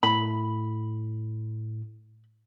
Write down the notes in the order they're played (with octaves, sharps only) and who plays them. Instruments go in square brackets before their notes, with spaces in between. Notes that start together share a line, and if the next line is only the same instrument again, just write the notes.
[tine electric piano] A2 [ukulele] B5